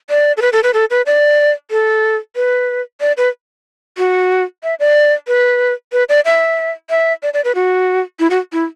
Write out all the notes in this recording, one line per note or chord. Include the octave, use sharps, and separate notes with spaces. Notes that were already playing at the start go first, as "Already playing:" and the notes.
D5
A4
B4
A4
B4
A4
B4
D5
A4
B4
D5
B4
F#4
E5
D5
B4
B4
D5
E5
E5
D5
D5
B4
F#4
E4
F#4
E4